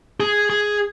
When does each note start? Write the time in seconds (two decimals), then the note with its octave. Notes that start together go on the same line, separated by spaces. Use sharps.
0.20 G#4
0.50 G#4